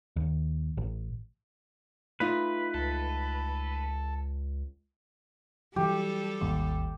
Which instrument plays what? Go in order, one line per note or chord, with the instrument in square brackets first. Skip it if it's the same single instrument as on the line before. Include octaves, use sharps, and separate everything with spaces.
[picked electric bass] D#2
A1
[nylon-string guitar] A3 D#4 F4 [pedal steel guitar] B4
[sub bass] C#2 [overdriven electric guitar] A4
[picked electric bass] E3 F#3 [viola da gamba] G3 A4 [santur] G4
[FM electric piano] G#1 D#2